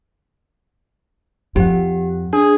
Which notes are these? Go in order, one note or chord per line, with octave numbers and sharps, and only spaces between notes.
F2 G4 F#5
D4 G#4